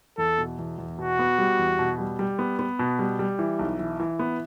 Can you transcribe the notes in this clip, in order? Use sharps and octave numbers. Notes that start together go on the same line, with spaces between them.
E2 A4
B2
E2
E2
B2 F#4
B3
G3
E2
B2
G3
G3
B3
B3
B2
G3
G3
E3
B1
E3
E3
B3